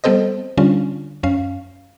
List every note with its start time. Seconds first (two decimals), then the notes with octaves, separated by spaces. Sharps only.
0.04 G3 B3 C4 A4 C5 D#5
0.57 D3 G3 C#4 D4 F4
1.23 F#2 C#4 F5